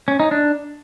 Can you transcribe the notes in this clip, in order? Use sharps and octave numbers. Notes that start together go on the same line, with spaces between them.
C#4
D#4
D4